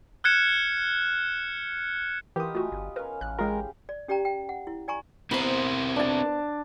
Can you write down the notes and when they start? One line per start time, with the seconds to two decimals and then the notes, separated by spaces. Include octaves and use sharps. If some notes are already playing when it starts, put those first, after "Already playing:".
0.24 F6 F#6 G#6 C#7 E7
2.36 E3 B3 D#4 F4 G4 A#4 D#6
2.55 A3 F4 F#4 G#5
2.72 G1
2.96 C#4 A#4 B4 F5
3.21 A1 F#6
3.39 G#3 F4 G4 G#4 A#4 G5
3.89 D5
4.08 C#4 G4 D5 G5 A#5
4.25 G5
4.49 F#5
4.67 E4
4.88 D5 G#5 A#5 C#6
5.31 B3 C4 E4 A#4 C5
5.96 D4 A5